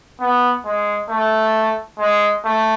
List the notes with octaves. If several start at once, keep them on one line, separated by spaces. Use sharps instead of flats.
B3
G#3
A3
G#3
A3